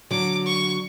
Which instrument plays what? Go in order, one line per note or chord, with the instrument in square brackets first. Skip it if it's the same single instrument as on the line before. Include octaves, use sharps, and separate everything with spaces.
[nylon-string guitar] D3 F#3 [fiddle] D6
[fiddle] C#6